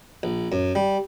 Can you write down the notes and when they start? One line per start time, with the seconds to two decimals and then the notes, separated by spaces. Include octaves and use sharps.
0.23 A#1
0.52 F#2
0.75 G3